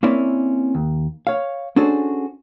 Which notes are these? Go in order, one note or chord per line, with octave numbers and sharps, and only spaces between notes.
A#3 C4 C#4 E4 D5
D#2
C#5 F5
C#4 D4 F#4 G#4 A4 C5